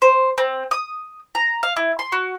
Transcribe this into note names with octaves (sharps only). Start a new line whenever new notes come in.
C5
C4
D#6
A#5
F5
E4
C6
F#4